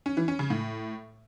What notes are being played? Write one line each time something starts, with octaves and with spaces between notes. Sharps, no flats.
C#4
E3
C#4
C#3
A2